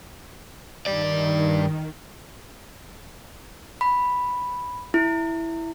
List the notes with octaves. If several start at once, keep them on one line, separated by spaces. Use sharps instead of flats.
G2 D#3 D5
B5
E4